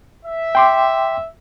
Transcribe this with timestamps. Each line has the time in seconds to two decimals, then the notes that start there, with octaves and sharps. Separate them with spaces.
0.24 E5
0.55 G5 C6 D6